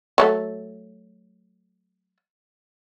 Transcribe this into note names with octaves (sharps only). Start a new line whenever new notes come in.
F#3 G3 A3